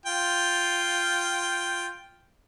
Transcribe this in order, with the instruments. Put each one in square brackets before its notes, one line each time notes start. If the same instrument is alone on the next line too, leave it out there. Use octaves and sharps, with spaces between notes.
[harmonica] F4 G5